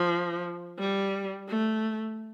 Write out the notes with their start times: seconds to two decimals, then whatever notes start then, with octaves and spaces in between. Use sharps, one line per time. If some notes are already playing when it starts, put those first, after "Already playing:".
Already playing: F3
0.79 G3
1.48 A3